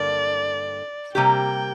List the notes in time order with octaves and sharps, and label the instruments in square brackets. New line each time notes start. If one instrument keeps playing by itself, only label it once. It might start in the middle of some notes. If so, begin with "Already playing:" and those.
Already playing: [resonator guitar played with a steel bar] G2 D3 A#3 [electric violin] D5
[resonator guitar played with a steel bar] C3 G3 A#3 G4 [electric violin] G5